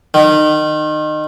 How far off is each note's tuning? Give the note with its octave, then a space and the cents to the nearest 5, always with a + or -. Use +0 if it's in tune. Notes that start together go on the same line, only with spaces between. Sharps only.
D#3 -25